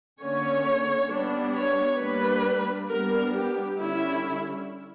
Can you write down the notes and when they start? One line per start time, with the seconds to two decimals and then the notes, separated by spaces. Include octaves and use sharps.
0.21 D3 A#3 C#4 C#5
1.10 G3 B3 D4
1.56 C#5
2.00 G3 A#3 D4 B4
2.90 G3 B3 D4 A#4
3.34 G4
3.80 D3 G3 C#4 E4